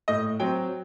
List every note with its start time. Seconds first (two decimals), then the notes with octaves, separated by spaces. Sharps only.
0.08 A2 D#5
0.40 F#3 C4 G5